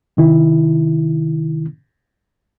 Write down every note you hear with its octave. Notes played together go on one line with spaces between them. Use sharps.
C3 D#3 E4